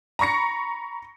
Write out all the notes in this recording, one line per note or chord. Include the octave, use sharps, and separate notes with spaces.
A#5 B5 C#6 A#6 C#7